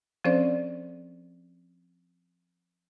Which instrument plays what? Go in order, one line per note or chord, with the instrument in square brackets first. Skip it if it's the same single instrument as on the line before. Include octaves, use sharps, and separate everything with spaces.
[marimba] F3 C4 C#4 A4 C5 D5